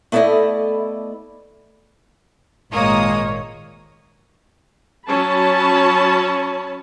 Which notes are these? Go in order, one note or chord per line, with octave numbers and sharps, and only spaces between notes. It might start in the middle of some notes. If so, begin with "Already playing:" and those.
A3 B3 E4 A4 D5 D#5
G#1 A#2 G#3 A#3 C#5 D#6
F#3 C#4 A5 B5